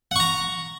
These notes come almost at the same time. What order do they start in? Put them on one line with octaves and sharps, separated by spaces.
F#5 C#6 A#5